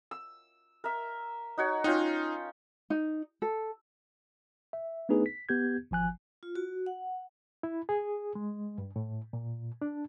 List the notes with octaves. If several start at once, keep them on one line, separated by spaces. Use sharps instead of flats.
E6
A#4 E5
D#4 F#4 C#5
C#4 D#4 F4 G5
D#4
A4
E5
A3 B3 D4 D#4 G#4 B4
B6
B3 G4 G6 G#6
G#1 F3 G#5 F#6
F4
F#4
F#5
E4
G#4
G#3
G2
A2
A#2
D4